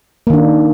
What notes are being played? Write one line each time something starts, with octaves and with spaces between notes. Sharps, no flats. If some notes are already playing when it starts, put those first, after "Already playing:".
D#3 A#3 D4